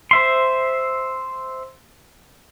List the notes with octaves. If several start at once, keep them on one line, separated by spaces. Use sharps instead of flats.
C5 E5 C6